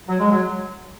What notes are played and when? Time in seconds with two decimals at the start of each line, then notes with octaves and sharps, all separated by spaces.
0.08 F#3
0.19 G#3
0.30 F#3